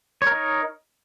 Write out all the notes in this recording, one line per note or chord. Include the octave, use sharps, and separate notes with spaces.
D#4 A#4 C#5